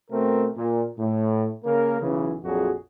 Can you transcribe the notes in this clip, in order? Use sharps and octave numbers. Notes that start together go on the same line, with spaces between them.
B2 A3 C4 A#4
A#2
A2
C#3 A#3 A#4
B1 C#3 E3
A#1 F2 F#3 F#4 G#4